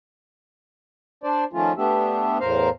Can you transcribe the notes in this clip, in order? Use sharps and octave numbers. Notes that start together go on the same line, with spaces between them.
D4 C5 D5
D#3 F3 A3 C#4 F4
A3 B3 D4 G4 E5
E2 A2 A#4 C5 F5 A#5